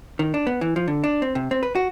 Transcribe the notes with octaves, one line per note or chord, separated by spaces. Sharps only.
D#3
D4
B3
E3
F3
D3
D4
C4
C3
C4
B4
F#4